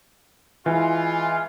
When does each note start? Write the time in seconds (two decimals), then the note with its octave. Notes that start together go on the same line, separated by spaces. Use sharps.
0.66 E3 G#3 F4